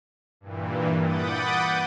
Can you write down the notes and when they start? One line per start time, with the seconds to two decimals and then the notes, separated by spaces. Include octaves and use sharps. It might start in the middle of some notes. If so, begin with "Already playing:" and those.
0.41 G2 A#2 E3
1.02 F#5 B5 D6 D#6 G6 A6